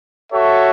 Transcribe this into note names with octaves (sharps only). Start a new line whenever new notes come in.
F#4 A4 C#5 E5